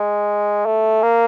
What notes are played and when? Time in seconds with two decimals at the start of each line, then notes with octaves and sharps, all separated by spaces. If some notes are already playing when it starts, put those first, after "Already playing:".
Already playing: G#3
0.66 A3
1.03 A#3